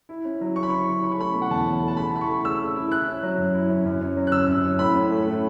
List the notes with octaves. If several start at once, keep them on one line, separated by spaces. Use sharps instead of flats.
E4
C#4
F#3
C#3 C#6
B5
E4 C#6
C#4
C#4 B5
C#6
A3 B5
B2
F#5
E2 A5
C#4
A3
A5
C#3 B5
E4 B5
C#6
A3
C#3 E6
C#3
E4
E4 F#6
C#4
F#3
F#2
E4
C#4
F#2
C#4
F#3
F#6
F#2 E6
F#2
C#4
A2 B5
C#4
A3
A2